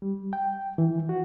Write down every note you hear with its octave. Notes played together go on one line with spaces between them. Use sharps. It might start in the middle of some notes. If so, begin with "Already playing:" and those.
G3
G5
E3
F#4